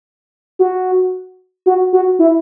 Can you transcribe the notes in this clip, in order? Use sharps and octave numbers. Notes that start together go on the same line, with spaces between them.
F#4
F#4
F#4
E4